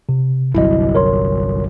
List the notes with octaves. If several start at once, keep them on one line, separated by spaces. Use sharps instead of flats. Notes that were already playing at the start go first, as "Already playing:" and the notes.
C3
G1 C2 F#3 E4 D#5
A#4 C#5 C6